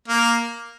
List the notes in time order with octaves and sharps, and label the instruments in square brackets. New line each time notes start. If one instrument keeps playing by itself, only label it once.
[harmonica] A#3 A#4